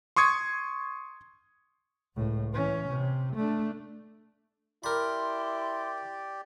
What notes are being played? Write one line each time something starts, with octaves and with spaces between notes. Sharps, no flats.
C6 C#6 D#6 G#6 C#7
C#2 A2
E3 C#4
C3
A3 D4
E4 G4 A#4 D5 B5 C6